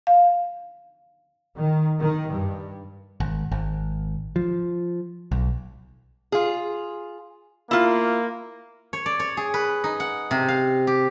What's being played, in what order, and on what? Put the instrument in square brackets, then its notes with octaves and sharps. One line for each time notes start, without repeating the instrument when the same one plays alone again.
[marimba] F5
[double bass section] D#3
D#3
G2
[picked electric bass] G#1
G#1
F3
B1
[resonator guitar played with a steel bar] F4 G#4
[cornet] A#3 [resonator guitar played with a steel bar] E4 F4
[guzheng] C#5
D5
C#5
G#4
B4
D#4
F#5
C3
F5
G4